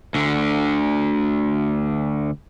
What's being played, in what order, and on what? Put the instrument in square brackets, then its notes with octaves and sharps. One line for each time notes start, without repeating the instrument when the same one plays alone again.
[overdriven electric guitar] D2 D3